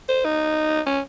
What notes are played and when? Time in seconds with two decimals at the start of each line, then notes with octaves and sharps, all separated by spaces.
0.09 C5
0.25 D#4
0.86 C#4